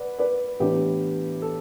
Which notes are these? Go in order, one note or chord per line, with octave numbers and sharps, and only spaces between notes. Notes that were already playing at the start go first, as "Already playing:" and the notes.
Already playing: B4 D5 F#5
B4 D5
A2 E3 B3 D4 G4 B4
A4